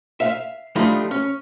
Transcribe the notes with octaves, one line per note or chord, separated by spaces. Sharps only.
E5 F5
F3 G3 A3 D4 D#4 F4
C#4